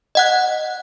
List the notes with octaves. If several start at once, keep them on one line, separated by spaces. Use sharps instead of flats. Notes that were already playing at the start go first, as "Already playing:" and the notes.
D#5 F#5 F#6